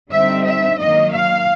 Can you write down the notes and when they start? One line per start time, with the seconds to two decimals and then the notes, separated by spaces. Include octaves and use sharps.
0.11 D3 G3 C4 D#4 E5
0.44 E5
0.78 D#3 F#3 A#3 D#5
1.12 F5